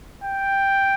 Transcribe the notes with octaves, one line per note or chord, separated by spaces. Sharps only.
G5